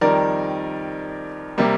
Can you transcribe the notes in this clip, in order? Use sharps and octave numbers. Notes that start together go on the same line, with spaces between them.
F2 D#3 G3 A#4 D5
C3 G3 A#3